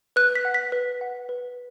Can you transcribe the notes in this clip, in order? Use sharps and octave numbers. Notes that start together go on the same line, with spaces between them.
B4 F#6
B6
F#5
B6
B4
F#5
B4